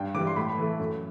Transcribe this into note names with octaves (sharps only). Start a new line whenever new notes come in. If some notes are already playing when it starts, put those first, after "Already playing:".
Already playing: G2 G5
E3 G3 D6
C6
A2 B5
E3 A3
F#2